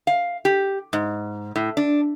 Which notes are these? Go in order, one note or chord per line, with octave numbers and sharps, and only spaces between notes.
F5
G4
G#2
A2
D4